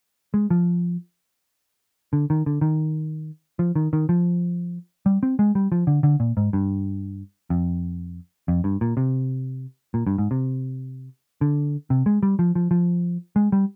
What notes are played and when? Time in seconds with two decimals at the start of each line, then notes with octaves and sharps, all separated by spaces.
0.34 G#3
0.50 F3
2.13 D3
2.30 D#3
2.46 D3
2.61 D#3
3.59 F3
3.76 D#3
3.93 D#3
4.09 F3
5.06 G3
5.23 C4
5.39 G#3
5.55 G3
5.72 F3
5.87 D3
6.03 D3
6.20 A#2
6.37 G#2
6.53 G2
7.50 F2
8.48 F2
8.64 G2
8.81 A#2
8.97 C3
9.94 A#2
10.07 G2
10.18 G#2
10.31 C3
11.41 D3
11.90 C3
12.06 G#3
12.23 G3
12.39 F3
12.55 F3
12.71 F3
13.36 G#3
13.52 G3